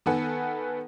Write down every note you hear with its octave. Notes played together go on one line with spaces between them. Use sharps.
D#3 B3 A4 B4 F#5 G#5